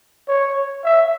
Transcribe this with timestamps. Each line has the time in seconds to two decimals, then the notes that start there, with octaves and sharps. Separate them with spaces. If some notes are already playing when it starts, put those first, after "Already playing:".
0.28 C#5
0.85 E5